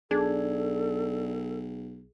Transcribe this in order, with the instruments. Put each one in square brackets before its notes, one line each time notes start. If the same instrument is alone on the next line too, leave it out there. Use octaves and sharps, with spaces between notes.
[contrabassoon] B1 [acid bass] D4 [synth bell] G#4 [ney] A4